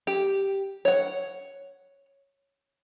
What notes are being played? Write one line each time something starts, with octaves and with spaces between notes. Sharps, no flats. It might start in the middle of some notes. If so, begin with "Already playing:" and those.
G4
C#5 F#5